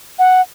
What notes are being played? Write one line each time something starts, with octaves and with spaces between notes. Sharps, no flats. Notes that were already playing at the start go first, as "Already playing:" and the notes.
F#5